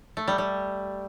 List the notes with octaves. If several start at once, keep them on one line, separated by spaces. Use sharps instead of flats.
A3
G3
G3